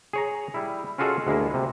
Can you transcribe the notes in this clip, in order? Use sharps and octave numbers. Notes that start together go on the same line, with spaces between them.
G#4 C#5 A#5
G3 E4
C#4 F4 F#4 G#4 A4 D#5
D2 G#3 A#3 E4
C3